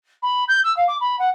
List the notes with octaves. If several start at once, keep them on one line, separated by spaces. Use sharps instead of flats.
B5
G6
E6
F5
D6
B5
F#5